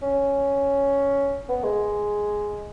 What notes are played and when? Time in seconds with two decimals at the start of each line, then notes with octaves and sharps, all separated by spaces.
0.02 C#4
1.48 B3
1.63 G#3